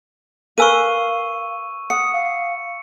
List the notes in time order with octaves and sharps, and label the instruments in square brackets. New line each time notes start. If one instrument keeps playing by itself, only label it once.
[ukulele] A#4 B4 G#5 [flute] F5 [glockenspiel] C#6 E6 D#7
[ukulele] F#5 [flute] D#6 [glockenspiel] C#7
[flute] F5